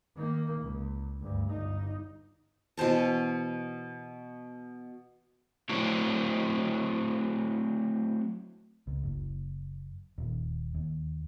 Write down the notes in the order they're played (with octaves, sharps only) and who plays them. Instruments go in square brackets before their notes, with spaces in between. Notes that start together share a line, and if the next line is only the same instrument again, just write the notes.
[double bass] D#3 A#3
C#2
D2 G2
G1 D#4
[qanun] B2 E3 C5 A5
[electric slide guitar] F#3 A3 C4 D4 E4 F#4
[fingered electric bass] C#2
F#1
D#1
D#2